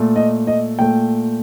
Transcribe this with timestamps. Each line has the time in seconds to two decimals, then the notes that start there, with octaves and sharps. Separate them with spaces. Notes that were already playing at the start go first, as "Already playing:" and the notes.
Already playing: A#2 A3
0.16 D#5
0.47 D#5
0.79 A#2 A3 G5